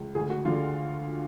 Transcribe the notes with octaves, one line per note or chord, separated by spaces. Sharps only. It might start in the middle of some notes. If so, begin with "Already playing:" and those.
Already playing: C#2
D2 G#4
F#4
D3 F4